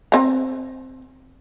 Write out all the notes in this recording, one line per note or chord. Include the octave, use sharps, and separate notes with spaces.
C4 A#5